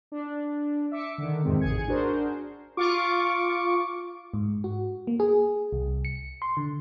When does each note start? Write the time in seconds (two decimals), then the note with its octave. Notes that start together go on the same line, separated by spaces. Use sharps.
0.12 D4
0.91 E5 D6 C#7
1.18 D3 D#3
1.43 F2 G#2 C3 D#3 G#3 C4
1.60 A1 G#4 G#5 G#6 C#7
1.88 D4 F#4 G#4 A#4 C5
2.77 F4 C#6 D6
4.34 G#2
4.64 F#4
5.07 A#3
5.20 G#4
5.73 C2
6.05 C#7
6.42 C6
6.57 D3